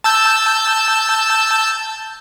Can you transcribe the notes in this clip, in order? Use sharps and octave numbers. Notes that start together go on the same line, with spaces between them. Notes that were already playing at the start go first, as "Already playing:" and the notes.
A5 E6 G6